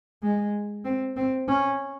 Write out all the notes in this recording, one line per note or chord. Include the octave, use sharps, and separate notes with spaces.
G#3
C4
C4
C#4